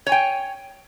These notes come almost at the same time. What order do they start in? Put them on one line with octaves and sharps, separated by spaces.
C#5 G#5 G5